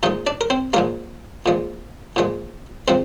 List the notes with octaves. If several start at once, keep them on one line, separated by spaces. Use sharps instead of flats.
A#2 F3 G#3 D#4 D#5
D4 D5
A#4
C4 C5
A#2 F3 G#3 A#3 A#4
A#2 F3 G#3
A#2 F3 G#3
F3 G#3 C4 C5